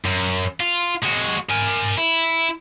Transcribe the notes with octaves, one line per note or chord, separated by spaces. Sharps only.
F#2
F4
G#3 F#4
A#4 G#5
E4